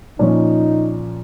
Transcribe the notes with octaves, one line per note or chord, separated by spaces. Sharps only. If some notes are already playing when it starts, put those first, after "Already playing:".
A#2 F3 C#4 D#4